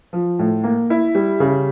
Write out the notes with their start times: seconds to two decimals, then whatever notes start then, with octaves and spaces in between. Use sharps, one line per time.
0.13 F3
0.39 A2
0.64 A#3
0.90 E4
1.15 G3
1.40 C#3